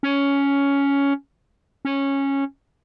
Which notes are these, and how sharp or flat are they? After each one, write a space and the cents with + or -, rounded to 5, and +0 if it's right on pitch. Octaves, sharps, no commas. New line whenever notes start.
C#4 +10
C#4 -10